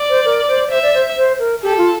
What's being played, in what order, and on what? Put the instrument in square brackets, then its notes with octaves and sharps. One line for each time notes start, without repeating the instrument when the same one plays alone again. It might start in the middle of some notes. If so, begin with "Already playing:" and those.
Already playing: [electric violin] D5
[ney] C5
A#4
C5
[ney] C5 [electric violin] E5
[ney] D5
C5
C5
A#4
[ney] G4 [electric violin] A4
[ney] F4